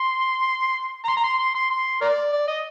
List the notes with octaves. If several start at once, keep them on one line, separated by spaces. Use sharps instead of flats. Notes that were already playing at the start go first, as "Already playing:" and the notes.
Already playing: C6
A#5
C6
A#5
C6
C6
C6
C6
A#4 D5
D5
D#5